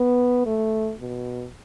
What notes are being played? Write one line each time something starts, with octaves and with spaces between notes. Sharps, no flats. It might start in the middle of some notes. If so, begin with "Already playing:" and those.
Already playing: B3
A3
B2